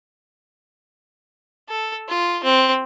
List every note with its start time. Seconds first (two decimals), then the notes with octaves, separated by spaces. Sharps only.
1.69 A4
2.08 F4
2.44 C4